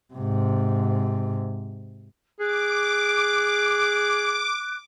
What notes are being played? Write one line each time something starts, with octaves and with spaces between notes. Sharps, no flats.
G#2 C3
G#4 D6 F#6